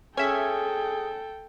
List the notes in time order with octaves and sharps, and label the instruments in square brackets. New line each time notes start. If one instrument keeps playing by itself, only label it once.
[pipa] C#4 [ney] G#4 [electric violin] A4 G5 [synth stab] E5 G#6